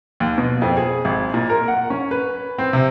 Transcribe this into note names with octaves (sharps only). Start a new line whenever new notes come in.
D#2
B2
F2
G#4
G#1
A#2
A#4
F#5
C#4
B4
C4
C3